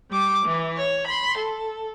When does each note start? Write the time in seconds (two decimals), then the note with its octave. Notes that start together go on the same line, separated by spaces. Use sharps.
0.11 G3 D6
0.46 E3
0.77 C#5
1.07 B5 C6
1.38 A4